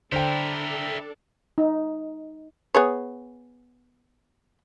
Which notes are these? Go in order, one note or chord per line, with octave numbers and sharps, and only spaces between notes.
D3 D4 E4 A4 A#4 C5 G5
D#4
B3 G#4 C#5